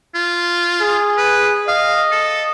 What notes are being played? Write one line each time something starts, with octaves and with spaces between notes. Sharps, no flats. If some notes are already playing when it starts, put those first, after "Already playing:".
F4
G#4
B4
D#5 F5
A4